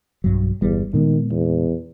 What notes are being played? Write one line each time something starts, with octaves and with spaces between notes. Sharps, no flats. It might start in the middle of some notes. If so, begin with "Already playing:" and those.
B1 G2 F#3
G1 E2 G3
A#2 D#3 G#3 B3
E2